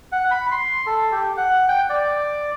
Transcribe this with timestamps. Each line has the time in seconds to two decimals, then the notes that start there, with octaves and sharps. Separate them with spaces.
0.12 F#5
0.31 B5
0.52 C6
0.86 A4
1.12 G4
1.37 F#5
1.68 G5
1.90 D5